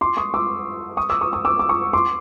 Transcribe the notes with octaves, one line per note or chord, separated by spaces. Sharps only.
C6 D6
C#6 D#6
D6 E6
C#6 D#6
D6 E6
C#6 D#6
C#6 D#6
D6 E6
D6
C#6 D#6
C6 D6